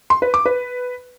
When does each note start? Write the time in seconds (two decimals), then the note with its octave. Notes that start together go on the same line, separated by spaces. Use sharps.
0.10 C6
0.22 B4
0.34 D6
0.46 B4